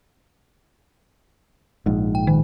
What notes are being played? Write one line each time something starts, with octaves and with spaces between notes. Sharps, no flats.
A#1 G#2
G5
D#3